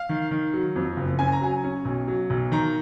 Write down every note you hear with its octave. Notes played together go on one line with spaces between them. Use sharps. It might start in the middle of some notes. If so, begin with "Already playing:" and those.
Already playing: F5
D#3
D#3
F#3
F2
F#1
C#4 G#5
A#5
F#3 G#5
C#4
B1
F#3
B1
D#3 A#5